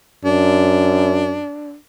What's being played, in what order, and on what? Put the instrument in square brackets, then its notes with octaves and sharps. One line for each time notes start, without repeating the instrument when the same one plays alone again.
[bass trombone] F#2 [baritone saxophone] D4